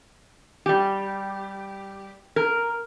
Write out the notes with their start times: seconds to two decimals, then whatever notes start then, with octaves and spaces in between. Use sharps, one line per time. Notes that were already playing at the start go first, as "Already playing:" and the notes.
0.66 G3 G4
2.36 A#4